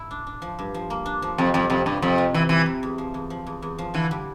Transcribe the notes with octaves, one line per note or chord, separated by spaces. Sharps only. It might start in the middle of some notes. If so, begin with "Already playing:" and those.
Already playing: A2 A3 E4
D4
D4
F3
G2
F3
A#3
D4
F3
F2 C3
F2 G3
F2 C3
G2 G3
F2 C4
C3
E3 C4
E3 G3
C3
E2
F3
E2
F3
E2
E2
F3
D3 E3
G3